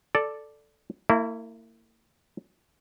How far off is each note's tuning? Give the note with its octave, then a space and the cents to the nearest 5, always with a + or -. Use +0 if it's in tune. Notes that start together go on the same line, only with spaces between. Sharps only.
A4 +0 D5 +0
A#3 -40 E4 +0